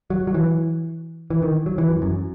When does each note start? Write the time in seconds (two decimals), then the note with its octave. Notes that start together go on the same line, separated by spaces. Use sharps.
0.10 F#3
0.27 F#3
0.34 E3
1.30 E3
1.42 D#3
1.66 F#3
1.78 E3
1.90 F#2
2.02 F#2